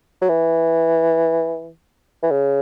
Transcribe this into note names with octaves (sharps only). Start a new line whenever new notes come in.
F#3
E3
E3
C#3